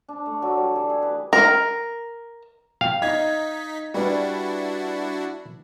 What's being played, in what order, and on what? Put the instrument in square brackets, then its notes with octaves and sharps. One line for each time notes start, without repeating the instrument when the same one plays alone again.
[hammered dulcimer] D4
A3
F#3
G3
E3
G#4
B4
[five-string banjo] A#4
[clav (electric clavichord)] F5 [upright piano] G5
[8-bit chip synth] D#4 B6 [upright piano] D#5 G#6
[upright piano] G3 B4 [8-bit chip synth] D4 E4 F#4